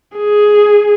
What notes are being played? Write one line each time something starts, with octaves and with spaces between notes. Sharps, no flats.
G#4